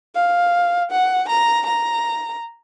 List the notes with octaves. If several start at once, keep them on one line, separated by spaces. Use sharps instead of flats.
F5
F#5
A#5
A#5